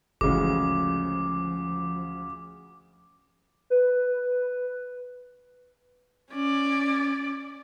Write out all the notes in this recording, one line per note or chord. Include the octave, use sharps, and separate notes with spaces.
G1 D2 C#3 E3 F3 G#3 D6
B4
C#4 D5